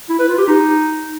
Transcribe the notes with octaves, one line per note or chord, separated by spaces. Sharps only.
E4
B4
F4
G4
D#4